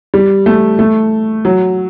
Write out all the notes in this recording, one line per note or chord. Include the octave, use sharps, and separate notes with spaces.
G3
A3
A3
F#3